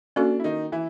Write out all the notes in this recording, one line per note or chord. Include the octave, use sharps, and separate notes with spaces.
A#3 C#4 D4 F#4 A4
E4
D#3 D#4
E3 E4